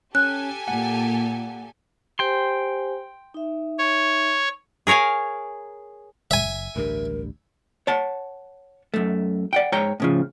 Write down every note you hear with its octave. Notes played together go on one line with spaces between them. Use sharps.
C#4 G4 A4 G#5 F#6
A#2 F#5
G4 C5 G5 G#5 C6
D#4 E5
C#5
G#4 A#4 C#5 F5 G#5
F#1 E5 G#5
A1 D2 G2 A#4
C#5 F#5 A5
F#2 A3
D5 F#5 G5
G#2 C#5 G5 A#5
A2 C#3 F3